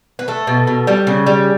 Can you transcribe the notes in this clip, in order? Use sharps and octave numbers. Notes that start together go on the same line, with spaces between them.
B4
A3 A4
B2
B2
G3
C#3
G3